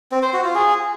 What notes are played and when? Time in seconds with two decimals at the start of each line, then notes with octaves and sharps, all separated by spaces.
0.12 C4
0.22 C5
0.33 F#4
0.44 F4
0.55 G#4